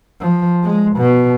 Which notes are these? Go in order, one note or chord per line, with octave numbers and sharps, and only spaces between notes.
F3
G#3
B2